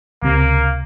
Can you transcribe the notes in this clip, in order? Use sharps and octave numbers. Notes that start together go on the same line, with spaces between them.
C#2 C3 A#3